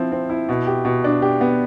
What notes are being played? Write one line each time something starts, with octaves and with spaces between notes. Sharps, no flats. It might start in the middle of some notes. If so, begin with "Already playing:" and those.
Already playing: F3 C4 E4
C4
E4
B2
G4
B2
D4
G4
B3